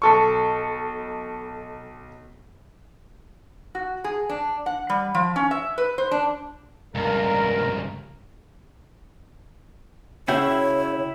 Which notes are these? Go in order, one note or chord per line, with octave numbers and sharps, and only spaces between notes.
B1 A4 C#6
F#4
G#4
D4
F#5
G3
F3
C#4
E5
B4
C5
D4
C#2 G2 A#4
C#3 E4 F#4 C#5 E5 G5 G6